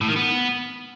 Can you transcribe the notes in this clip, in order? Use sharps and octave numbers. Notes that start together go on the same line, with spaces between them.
A2
D#3
B3